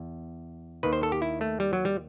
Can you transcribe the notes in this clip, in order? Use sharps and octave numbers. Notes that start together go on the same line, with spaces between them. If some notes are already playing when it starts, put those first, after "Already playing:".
Already playing: E2
D#2 D#3 B4
C5
A4
G4
E4
A3
G3
F#3
G3